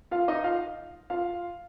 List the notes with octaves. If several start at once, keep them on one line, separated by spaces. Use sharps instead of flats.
F4 F5
D#4 D#5
F4 F5
F4 F5